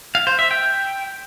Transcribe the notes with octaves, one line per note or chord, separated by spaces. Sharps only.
F5
C5
E5
G5